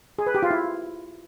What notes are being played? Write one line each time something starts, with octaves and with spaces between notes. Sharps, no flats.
G#4
B4
G4
F4
E4